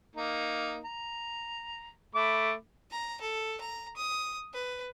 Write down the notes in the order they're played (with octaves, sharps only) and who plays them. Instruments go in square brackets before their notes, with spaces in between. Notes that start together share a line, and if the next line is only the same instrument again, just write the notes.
[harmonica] A#3 D#4
A#5
A3 B5 D6
[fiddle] A#5
A4
A#5
D#6
B4